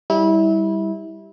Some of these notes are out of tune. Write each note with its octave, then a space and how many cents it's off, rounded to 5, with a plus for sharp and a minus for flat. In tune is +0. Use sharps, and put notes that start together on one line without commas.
G3 +5 E4 -25